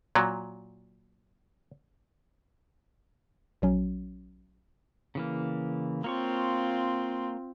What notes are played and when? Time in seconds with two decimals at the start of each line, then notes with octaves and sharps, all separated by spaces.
0.15 A#2 F#3
3.62 A#1 F#3 C#4
5.15 C#3 E3 A#3
6.04 A#3 C4 F4 C#5 C#6